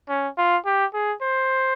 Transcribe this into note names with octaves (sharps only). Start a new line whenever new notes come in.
C#4
F4
G4
G#4
C5